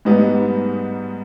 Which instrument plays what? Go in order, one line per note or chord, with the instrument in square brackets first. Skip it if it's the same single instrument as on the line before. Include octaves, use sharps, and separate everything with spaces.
[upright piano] G#2 G3 B3 D#4